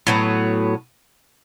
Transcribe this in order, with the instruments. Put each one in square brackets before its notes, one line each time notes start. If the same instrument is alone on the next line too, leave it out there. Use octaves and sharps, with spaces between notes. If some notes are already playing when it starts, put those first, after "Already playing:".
[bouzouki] A2 F#3 B3